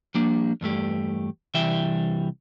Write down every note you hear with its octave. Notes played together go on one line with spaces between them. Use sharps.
F3 G3 A#3 D4
E2 G2 A3 G4
C2 E3 G3 E5 G5